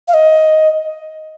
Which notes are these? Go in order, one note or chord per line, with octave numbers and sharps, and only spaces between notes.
F5
D#5